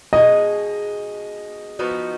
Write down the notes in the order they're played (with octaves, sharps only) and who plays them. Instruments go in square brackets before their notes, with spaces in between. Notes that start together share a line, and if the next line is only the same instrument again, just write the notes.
[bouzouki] B2 G#3 D#4 G#4 [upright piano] D#5
[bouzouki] F3 B3 D#4 F#4